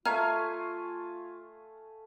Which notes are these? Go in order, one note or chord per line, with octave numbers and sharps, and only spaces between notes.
A3 F4 F5 G#5 A#5 F6